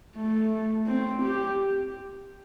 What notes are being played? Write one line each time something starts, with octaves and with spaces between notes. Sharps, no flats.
A3
C4
G4